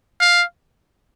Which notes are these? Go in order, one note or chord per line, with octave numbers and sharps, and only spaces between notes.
F5